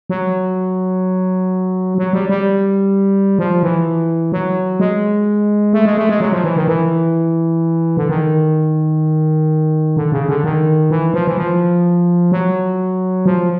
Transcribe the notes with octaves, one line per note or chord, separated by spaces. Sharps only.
F#3
F#3
G3
G3
F3
E3
F#3
G#3
A3
G#3
A3
G#3
F#3
F3
E3
D#3
E3
D3
D#3
D3
C#3
D3
D#3
E3
F3
E3
F3
F#3
F3